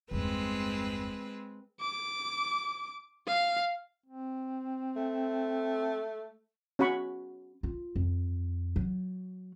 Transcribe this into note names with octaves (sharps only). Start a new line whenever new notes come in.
G1 E2 G#3 C4 B4
D6
F5
C4
A3
C#4 F#4 F#5 B5 C#6
F4
F2
F#3